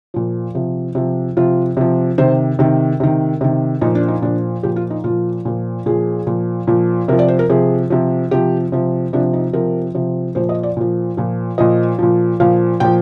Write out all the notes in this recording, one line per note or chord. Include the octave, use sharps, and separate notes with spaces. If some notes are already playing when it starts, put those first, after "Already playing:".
A#2 F3
C3 F3
C3 F3
C3 F3 F4
C3 F3
C3 D#3 C5
C3 D#3
C3 D#3
C3 D#3
A#2 F3 D#4
D4
D#4
A#2 F3 D4
A#2 F3 G4
F4
D#4
A#2 F3 F4
A#2 F3
A#2 F3 G#4
A#2 F3
A#2 F3
C3 F3 A#4
D5
C5
A#4
C3 F3 G#4
C3 F3
C3 F3 G4
C3 F3
C3 F3 D4
D#4
C3 F3 A#4
C3 F3
A#2 F3 C5
D#5
D5
A#2 F3
A#2 F3
A#2 F3 D#5
A#2 F3
A#2 F3 F5
A#2 F3 G5